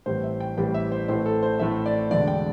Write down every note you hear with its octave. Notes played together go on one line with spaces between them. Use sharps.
A1 A2 E3 G3 C4 C5
E5
G5
A1 A2 E3 G3 C4 G5
E5
C5
A1 A2 A3 C4 C5
A4
C5
A1 A2 A3 C4 E5
D5
E1 E2 D3 D5
G5